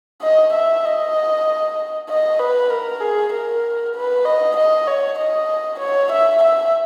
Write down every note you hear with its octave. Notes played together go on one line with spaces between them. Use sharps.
D#5
E5
D#5
D#5
B4
A#4
G#4
A#4
B4
D#5
D#5
C#5
D#5
C#5
E5
E5